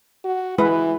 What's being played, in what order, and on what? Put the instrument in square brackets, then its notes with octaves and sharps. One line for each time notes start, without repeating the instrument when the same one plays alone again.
[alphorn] F#4
[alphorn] E3 [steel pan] G#3 E4 B4